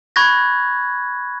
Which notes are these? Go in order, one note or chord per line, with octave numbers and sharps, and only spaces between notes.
B5 C#6 F#6 G#6 A#6